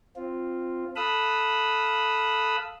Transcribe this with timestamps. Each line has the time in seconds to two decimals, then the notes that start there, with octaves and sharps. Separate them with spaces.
0.16 C4 F4
0.96 A4 F5 B5 D#6 E6 F#6